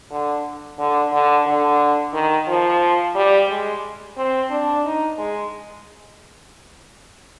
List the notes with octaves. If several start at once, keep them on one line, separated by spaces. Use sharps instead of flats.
D3
D3
D3
D3
D#3
F3
G3
G#3
C4
D4
D#4
G#3